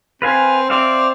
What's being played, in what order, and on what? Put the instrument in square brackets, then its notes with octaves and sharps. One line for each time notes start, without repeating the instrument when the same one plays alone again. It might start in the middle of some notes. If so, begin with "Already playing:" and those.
[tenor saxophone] C4 [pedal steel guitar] B4 F5 G#5
[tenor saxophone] C4 [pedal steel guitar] D5 E5 F5